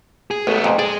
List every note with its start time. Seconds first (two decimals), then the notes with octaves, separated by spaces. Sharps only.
0.31 G#4
0.47 A1 A3 B3
0.64 F2 A#2
0.79 G#3 G#4 D5